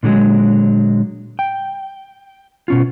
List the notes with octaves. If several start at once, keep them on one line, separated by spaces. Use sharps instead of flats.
A#2 D3 E3 F#3 G#3
G5
B2 C#4 F4